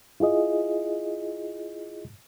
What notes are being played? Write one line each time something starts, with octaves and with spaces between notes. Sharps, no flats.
E4 F4 G#4 D#5